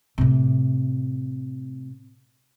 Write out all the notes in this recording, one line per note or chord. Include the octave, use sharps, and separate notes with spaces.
A2 C3